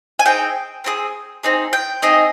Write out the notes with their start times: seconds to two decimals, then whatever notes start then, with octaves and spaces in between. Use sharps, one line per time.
0.19 G#5
0.26 C4 D#4 G#4 G5
0.84 C4 D#4 G#4
1.43 C4 D#4 G#4
1.73 G5
2.02 C4 D#4 G#4 D#5